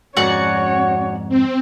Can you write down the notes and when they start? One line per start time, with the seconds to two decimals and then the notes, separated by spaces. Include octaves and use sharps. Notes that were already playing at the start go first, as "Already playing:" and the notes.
0.17 F2 G#2 C#4 F#4 C#5 D5 F#5
1.29 C4